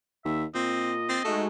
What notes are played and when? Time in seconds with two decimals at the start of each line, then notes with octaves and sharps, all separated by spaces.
0.25 D#2 E5
0.54 A#2 C4 D#5
1.09 C4 A6 C7
1.24 G#3 A3 D#4 F#4